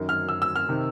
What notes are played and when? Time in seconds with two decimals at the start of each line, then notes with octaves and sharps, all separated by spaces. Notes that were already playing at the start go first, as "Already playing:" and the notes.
Already playing: F#2 D#3
0.09 F6
0.29 E6
0.42 E6
0.56 F6
0.69 C3 D#3